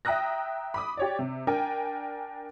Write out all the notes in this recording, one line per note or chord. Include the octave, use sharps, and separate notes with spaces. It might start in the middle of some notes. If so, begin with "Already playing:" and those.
E5 G5 A#5 D#6 F#6 A#6
B5 D6 D#6
G4 C#5 D5
C3
D4 A#4 G5 G#5